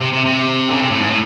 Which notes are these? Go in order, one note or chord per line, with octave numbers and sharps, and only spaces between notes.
C3
C3
C3
D3
C#3
C3
A2
G#2
A2